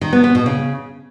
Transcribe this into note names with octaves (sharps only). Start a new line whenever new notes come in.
D#3
B3
B3
B2
C#3